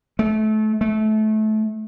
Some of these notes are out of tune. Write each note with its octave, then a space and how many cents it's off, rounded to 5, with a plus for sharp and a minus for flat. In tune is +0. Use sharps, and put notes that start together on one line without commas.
A3 -25
A3 -25